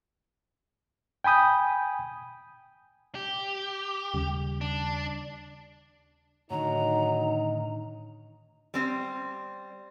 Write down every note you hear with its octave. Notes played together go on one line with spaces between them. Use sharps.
G5 G#5 B5 D#6 G6
G4
D#2 C#3 G3
D4
A2 D3 D#3 F#3 D#4 A#5
G3 C4 C5